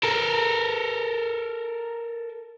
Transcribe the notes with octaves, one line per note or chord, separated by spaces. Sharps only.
A4 A#4